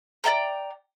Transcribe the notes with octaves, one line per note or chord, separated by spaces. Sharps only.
D5 D#5 G5 A#5